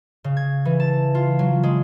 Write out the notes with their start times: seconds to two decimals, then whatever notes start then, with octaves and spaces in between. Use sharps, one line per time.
0.24 C#3
0.37 G#6
0.65 E3
0.80 A5
1.15 F4
1.39 F#3
1.63 G#3